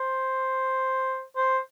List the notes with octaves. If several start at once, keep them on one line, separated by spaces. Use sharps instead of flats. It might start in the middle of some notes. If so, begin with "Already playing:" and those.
Already playing: C5
C5